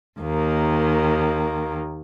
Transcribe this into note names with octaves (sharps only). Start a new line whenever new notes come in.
D#2 D#3 A#3